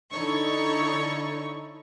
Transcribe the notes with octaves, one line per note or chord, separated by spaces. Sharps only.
D3 D#4 E4 A4 C#5 C#6